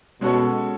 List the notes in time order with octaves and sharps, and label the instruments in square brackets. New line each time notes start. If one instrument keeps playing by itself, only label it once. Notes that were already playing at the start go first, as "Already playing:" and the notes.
[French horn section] B2 [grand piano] G#3 C#4 F#4 A4 C#5